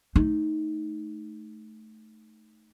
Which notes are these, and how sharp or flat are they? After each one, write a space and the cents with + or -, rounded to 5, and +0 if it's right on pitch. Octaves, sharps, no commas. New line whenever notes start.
A3 -10 D#4 +0